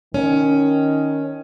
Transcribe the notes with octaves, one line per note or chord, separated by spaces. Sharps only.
D#3 C#4